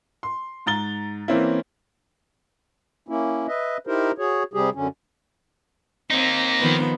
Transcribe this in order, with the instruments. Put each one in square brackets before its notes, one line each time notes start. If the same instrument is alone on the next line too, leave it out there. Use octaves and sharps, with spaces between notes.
[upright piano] C6
G#2 A#5 A6 G7
E3 A#3 C4 C#4 E4
[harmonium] A#3 C#4 E4
B4 D#5 E5
D#4 E4 G4 A#4 C5
F#4 G#4 C#5
C3 G3 G4 G#4
F#2 D3 C#4
[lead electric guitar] A#3 D#4 [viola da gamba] C4
[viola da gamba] D#3 F3 B3